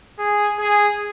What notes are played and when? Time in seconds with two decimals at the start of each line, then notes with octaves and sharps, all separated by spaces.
0.19 G#4
0.60 G#4